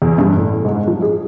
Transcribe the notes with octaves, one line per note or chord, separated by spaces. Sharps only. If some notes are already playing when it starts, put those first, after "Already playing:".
E2
G2
A2
G#2
F3
G#4